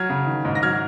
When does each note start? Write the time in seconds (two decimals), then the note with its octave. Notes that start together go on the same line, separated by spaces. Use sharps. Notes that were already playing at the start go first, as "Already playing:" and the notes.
Already playing: F#3 F6 G#6
0.10 C#3
0.27 D#3
0.45 G#2
0.55 A#6
0.63 F#3 F6 G#6